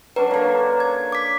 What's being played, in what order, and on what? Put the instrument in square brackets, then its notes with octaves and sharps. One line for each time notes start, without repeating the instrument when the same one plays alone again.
[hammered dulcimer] F#3 C#4 D4 [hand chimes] B4
[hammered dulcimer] D3 A#3
[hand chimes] G#6
D6 B6